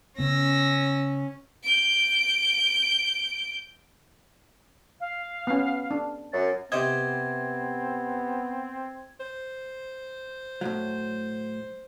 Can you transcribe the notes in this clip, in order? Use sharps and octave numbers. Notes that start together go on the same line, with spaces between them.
C#3 B3 C#4 E6 A#6
G6 D7
F5
B3 C#4
D4
F#2 A6
C3 B3 C4 C5 D#5 G#6
C5
A2 F#3